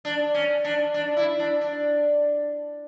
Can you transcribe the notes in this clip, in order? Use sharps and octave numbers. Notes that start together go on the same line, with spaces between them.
D4
C#4
D4
D4
E4
D4
D4